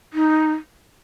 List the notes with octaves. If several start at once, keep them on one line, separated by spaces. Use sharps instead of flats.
D#4